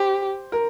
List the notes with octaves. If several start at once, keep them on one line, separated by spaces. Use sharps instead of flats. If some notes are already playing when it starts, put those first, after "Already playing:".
Already playing: G4 C5
A#4